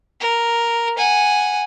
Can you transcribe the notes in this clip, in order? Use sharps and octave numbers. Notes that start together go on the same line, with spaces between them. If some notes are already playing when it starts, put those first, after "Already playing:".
A#4
F#5 G#5